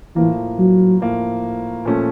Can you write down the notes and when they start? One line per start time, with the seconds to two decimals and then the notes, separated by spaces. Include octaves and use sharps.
0.16 A2 E3 F3 A#3
0.59 F#3
1.01 A2 F3 A#3
1.85 A#2 F3 A3 C#4